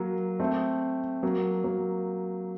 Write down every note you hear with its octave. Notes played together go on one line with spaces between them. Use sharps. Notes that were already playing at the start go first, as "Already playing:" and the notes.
Already playing: F#3 A#3
A3 C4
F#3 A#3
F#3 A#3